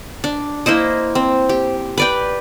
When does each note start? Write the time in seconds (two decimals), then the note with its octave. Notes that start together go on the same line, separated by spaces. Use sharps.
0.24 D4
0.66 A#3 E4 C5 D#5
1.15 C4
1.49 G4
1.98 B4 D5 G5